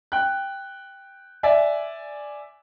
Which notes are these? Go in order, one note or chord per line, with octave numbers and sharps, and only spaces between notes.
G5 F#6
D5 E5 G#5